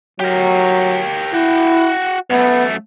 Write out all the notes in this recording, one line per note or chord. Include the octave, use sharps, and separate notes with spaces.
F#3 G4 A#4
E4 F#4 G5
F#2 A3 B3